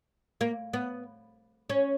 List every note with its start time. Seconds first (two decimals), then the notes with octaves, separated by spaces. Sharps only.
0.41 A#3
0.73 B3
1.70 C#4